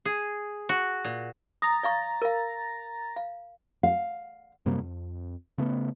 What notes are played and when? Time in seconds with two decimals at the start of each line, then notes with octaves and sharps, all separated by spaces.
0.05 G#4
0.69 F#4
1.05 A#2
1.62 A#5 D#6 A6 A#6
1.83 D5 F5 C#6
2.22 A#4 F5
3.16 F5
3.83 F5
4.66 F#2 C3 G3 A#3
4.79 F2
5.58 C#3 A3 B3